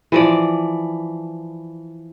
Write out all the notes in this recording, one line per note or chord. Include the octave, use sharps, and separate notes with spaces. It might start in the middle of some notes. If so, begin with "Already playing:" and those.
E3 F3 D5